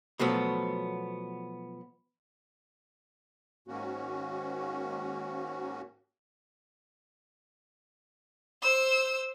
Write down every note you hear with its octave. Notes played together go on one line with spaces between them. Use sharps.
B2 F3 F#3 A3 B3
G#2 D#3 A#3 C#4 F#4
C5 E6